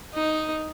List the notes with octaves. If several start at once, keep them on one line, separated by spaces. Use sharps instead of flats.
D#4